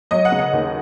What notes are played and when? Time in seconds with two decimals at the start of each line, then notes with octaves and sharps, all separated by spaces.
0.11 F#3 D#5
0.25 F#5
0.32 C#3
0.39 F#5
0.53 D#2